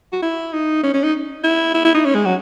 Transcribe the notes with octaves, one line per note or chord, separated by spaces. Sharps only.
F#4
E4
D#4
C#4
C#4
D#4
E4
E4
E4
D#4
C#4
G#3
F#3